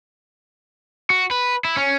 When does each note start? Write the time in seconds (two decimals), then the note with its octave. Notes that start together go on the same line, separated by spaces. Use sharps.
1.10 F#4
1.31 B4
1.65 E4
1.77 C#4